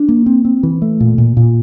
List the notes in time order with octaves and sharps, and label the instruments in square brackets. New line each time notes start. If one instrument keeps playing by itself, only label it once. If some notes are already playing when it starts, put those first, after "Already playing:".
Already playing: [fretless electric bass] D4
A#3
C4
C4
E3
A3
A#2
A#2
A#2